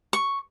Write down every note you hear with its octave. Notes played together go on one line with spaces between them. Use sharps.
C#6